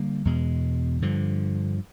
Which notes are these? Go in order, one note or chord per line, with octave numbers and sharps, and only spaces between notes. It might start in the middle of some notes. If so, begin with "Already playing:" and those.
Already playing: D3 G3 A#3
E2 B2 G#3
G2 D3 F3